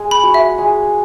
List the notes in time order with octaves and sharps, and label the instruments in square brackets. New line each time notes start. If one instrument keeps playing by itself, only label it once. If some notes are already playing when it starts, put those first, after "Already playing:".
Already playing: [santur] G#3
[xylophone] B5
[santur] F#4
[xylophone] E5
[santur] G#3